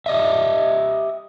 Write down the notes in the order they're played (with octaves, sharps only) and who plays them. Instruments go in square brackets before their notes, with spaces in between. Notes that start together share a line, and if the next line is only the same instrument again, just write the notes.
[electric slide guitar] G4 D#5 E5